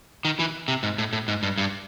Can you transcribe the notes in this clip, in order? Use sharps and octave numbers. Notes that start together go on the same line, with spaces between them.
D#3
E3
C3
G#2
A2
A2
G#2
G2
G2